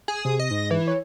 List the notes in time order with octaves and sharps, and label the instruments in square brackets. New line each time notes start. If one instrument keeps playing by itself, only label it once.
[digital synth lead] G#4
[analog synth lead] C3
[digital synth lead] D#5
[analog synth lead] G#2
[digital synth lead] E3
[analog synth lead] C#5